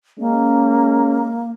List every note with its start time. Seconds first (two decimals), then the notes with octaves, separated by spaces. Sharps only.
0.19 G#3 A#3 C#4